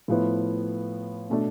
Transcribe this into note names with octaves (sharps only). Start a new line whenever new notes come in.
A2 F3 B3 E4
B2 A3 D4